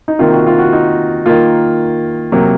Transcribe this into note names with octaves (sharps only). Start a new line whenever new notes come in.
D#4
C3 D#3 A#3 F4
F#4
F4
F#4
D#4
D#3 A#3 F4
C3 F#3 A#3